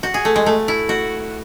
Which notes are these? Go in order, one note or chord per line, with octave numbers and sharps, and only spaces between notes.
F#4
G#4
A3
G#3
A3
E4
F#4